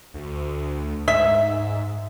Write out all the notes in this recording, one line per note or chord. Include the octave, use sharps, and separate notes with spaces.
D2
G#2 E5